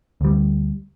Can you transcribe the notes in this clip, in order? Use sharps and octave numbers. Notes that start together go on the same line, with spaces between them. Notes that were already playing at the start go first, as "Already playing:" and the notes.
D2 G3